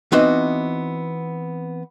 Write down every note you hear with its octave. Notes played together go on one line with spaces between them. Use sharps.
E3 B3 C4 D#4 F#4 D#5